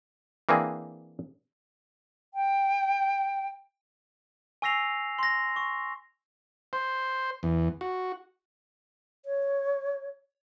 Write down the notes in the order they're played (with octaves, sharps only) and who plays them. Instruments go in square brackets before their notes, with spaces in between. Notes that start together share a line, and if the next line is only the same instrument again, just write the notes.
[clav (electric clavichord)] E3 A#3 C4 D4 G#4
[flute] G5
[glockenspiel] G#5 C#6 E6 A#6 C7 F7
C6 A#6
C#6
[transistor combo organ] C5
E2
F#4
[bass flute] C#5